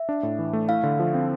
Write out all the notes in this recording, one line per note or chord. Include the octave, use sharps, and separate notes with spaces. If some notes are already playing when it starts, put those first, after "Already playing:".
Already playing: E5
D4
A2
E3
A3
E4 F5
D3
F3
C4